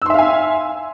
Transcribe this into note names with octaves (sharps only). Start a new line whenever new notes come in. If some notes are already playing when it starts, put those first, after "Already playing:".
E5 F5 G#5 C6 E6